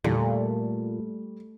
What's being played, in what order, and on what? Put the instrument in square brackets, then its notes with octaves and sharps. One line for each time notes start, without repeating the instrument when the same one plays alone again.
[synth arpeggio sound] E2 D3 [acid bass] A#2 [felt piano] G3 [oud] A3